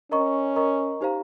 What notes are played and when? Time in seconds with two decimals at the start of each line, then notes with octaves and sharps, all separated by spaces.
0.11 C#4 A#4 D#5 A#5 C#6
0.56 A#4 D#5 A#5 C#6
1.01 D#4 G4 C5 F5 A#5